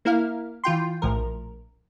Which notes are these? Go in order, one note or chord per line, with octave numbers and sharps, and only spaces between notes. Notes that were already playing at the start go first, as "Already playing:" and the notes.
A#3 E4 A#4 F5
E3 F4 G5 C6
A#1 A2 F3 A#4